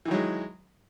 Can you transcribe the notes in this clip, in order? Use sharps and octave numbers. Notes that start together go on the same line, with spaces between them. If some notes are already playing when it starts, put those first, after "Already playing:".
D#3 E3 F#3 G#3